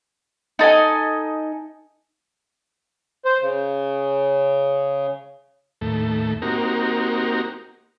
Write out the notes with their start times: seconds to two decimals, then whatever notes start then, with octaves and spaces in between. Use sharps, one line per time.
0.59 D#4 A4 D#5 G#5
3.25 C5
3.41 C#3
5.81 D#2 A2 A3
6.42 A#3 C4 D#4 F#4 G4 A#4